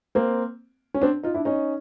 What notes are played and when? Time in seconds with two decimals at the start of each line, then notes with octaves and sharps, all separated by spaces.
0.15 A#3 C4
0.94 C#4
1.02 C4 D4
1.23 D#4 F4
1.34 D4 E4
1.45 C#4 D#4